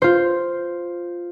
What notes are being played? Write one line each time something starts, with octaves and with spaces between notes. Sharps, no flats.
F4 C5